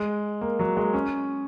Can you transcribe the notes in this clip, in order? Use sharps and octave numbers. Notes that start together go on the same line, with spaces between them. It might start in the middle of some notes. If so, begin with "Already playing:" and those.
Already playing: G#3
A#3
F#3
G#3
C#4